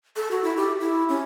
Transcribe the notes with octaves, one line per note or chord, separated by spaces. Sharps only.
A4
F#4
E4
G4
E4
C#4